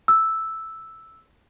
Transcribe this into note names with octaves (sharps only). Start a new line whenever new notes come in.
E6